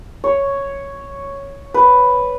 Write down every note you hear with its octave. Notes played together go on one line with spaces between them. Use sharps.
C#5
B4